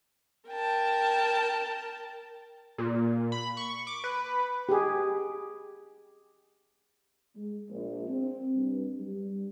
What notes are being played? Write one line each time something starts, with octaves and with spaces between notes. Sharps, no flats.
A#4 G5 A5
A#2
B5
C#6
D6
B4
G4 G#4
G#3
A#1
C4
G2
G3